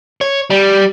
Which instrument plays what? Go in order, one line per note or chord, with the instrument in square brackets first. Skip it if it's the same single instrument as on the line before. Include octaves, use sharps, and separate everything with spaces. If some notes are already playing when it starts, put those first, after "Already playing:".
[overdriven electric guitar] C#5
G3